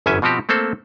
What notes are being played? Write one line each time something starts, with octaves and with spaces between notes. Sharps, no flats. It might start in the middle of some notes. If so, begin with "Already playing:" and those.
G1 F#2 E3 C#4 E5 G#5
B2 F3 C4 F#4 G4
A3 A#3 C4 A4 C5